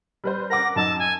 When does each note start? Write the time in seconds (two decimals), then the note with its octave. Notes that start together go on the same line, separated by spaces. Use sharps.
0.24 G3 B4 C5
0.50 A#4 F#5 D6 A#6
0.76 F#2 D#4 A5 E6
0.99 G#5